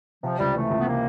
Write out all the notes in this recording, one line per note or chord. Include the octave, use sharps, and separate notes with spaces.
C3 F3
C#2 G3
E3 A3
C#2
B3
C3 A#3